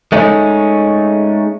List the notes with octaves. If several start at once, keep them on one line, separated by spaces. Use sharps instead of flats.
G#3 A3 C#4 D#4